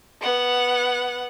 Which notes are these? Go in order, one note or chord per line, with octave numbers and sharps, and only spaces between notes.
B3 F#5